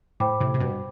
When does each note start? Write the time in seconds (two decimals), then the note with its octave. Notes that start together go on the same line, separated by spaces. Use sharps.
0.20 A2 C5 G5 B5 D6
0.40 A2 C3
0.54 C3
0.60 G2 B2